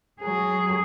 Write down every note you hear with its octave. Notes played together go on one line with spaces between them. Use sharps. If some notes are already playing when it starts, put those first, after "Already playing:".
F#3 G#4